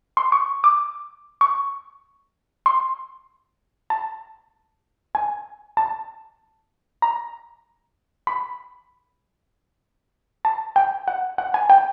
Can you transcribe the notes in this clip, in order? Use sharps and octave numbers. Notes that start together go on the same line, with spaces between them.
C6
C#6
D6
C#6
C6
A5
G#5
A5
A#5
B5
A5
G5
F#5
F#5
G#5
G5